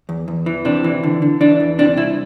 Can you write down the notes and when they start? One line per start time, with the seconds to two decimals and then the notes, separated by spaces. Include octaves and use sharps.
0.09 E2
0.28 E2
0.46 E3
0.65 C3 D4
0.84 E3
1.03 D3
1.22 D3
1.41 E3 D4
1.60 E2
1.79 C3 D4
1.97 C2 E4